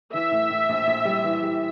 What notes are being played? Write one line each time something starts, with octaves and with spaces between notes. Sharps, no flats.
E3 E5
A2
A2
A#1
A#1
G3
E3
G3